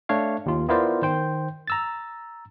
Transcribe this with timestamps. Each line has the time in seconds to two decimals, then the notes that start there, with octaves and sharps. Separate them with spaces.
0.09 A3 D4 C#5 F5
0.46 D#2 F4
0.69 B3 E4 F4 A#4 C5 D5
1.02 D#3 C5 G5
1.68 A#5 E6 A6